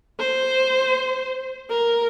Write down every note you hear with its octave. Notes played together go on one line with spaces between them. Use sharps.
C5
A#4